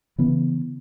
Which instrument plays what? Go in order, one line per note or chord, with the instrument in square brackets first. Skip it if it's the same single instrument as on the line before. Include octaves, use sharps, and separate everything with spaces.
[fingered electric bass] C#3 E3 B3